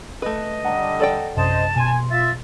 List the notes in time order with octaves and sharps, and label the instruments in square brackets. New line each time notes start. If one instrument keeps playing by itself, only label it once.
[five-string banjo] A3 B4 [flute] D#5
[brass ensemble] D3 G3 D4 [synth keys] F#5 A5 A#5
[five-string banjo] A4 D5 G5
[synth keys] A#1 F#2 C3 [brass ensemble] C5 D#5 [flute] A5
[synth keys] B2 C6 [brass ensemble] G#5
[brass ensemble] F4 E5 [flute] A6